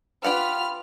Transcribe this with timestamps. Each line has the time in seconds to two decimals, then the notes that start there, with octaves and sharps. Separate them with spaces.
0.24 F4 G4 B4 F#5 B5 F6